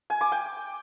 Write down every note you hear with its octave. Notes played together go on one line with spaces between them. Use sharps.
G#5
D6
G5